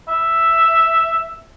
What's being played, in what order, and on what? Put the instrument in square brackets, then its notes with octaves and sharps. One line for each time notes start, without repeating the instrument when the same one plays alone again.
[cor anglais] E5